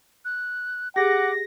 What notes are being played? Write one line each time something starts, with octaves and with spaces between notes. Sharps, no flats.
F#6
G4 G#4 F#5 D6 A#6